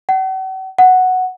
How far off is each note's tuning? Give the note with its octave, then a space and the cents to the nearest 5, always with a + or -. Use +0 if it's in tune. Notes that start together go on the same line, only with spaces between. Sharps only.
F#5 +45
F#5 +0